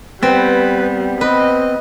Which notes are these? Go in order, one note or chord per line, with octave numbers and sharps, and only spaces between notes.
G3 B3 C4 B4
C4 B4 D#5